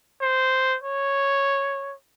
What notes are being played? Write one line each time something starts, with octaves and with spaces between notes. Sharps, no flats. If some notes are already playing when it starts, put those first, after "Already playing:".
C5
C#5